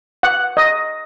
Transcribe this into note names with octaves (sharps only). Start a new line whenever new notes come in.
F#5
D#5